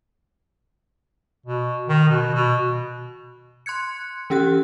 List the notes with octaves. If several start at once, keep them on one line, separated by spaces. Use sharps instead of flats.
B2
D#3
B2
B2
C6 F#6 G#6 C#7
E3 C#4 G4 F#5 F#6